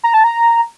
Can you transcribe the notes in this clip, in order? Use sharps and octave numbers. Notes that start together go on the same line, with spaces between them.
A#5
A5
A#5